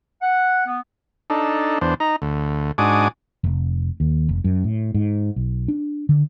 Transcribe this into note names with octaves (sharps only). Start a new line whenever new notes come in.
F#5
B3
D4 D#4 A4
E2 D4 C5
D#4 A#5
D2
G#2 D4 F#4 G#5 D6 D#6
F1
D#2
F1
F#2
A2
G#2
B1
D4
D3